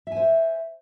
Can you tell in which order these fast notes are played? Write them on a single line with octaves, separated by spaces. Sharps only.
E5 G#5 C5